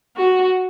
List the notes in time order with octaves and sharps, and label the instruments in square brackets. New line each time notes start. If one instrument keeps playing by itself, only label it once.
[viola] F#4